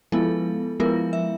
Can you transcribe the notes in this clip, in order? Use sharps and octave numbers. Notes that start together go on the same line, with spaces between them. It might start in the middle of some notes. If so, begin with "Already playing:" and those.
F3 G#3 B3 E4 A4
F3 G#3 B3 E4 A#4
E5